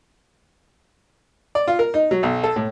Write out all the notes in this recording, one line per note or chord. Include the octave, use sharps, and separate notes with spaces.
D5
F4
A#4
D#4
F#3
B1
A4
A2